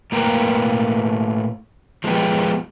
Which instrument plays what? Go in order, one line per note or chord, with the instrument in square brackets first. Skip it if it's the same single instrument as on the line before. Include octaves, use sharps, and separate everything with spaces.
[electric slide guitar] A2 A#3 A#4 B4 G5 A#5
F3 G#3 B3 E4 G4